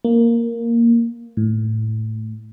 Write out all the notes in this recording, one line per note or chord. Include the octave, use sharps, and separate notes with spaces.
A#3
A2